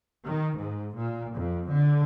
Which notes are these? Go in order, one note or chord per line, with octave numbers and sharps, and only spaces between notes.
D#3
G#2
A#2
F2
D3